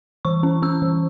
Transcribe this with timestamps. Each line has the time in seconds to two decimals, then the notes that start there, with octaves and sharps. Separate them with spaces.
0.25 E3 C#6
0.43 C#4
0.62 C#4 E6
0.82 E3